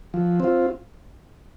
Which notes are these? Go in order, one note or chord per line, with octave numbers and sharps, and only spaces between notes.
F3
C4 F4